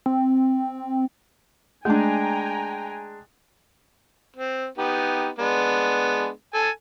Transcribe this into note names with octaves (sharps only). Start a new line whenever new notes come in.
C4
G#3 A3 D4 G5 G#5 A#5
C4
B3 D#4 G4
G#3 B3 D4
A4 G#5